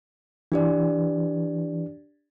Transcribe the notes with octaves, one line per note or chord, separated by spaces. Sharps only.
E3 D4 G4 D5